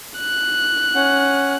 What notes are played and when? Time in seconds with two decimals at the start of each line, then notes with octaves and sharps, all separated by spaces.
0.18 F#6
0.95 C#4 F#5